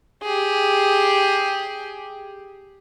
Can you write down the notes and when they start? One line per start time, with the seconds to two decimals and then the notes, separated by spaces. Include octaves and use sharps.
0.23 G4 G#4